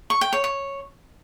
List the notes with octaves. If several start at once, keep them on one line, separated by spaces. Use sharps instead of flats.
C#6
G5
C#5
C#5